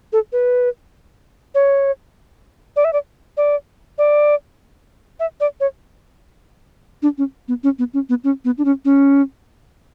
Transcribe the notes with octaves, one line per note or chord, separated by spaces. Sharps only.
A4
B4
C#5
D5
E5
D5
D5
D5
E5
D5
C#5
D4
C#4
B3
C#4
B3
C#4
B3
C#4
B3
D4
C#4
C#4